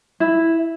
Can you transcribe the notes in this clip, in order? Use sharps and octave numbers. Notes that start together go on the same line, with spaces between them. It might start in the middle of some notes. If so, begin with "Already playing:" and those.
E4